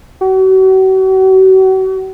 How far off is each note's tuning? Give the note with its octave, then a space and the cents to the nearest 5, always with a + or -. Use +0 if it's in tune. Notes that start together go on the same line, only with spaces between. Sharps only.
F#4 +40